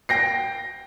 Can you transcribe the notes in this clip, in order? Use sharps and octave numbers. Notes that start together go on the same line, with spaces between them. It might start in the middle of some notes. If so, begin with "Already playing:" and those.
G5 A#6 C7